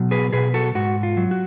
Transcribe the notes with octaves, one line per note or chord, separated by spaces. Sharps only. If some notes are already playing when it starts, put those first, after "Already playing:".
Already playing: B2 F#3
G#4 B4
B2 G#4 B4
F#4 A4
G#2 F#4
F4
F#3
F#4